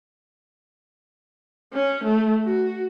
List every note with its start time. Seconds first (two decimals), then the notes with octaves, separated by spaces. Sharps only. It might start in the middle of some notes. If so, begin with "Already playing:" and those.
1.74 C#4
2.05 A3
2.44 F#4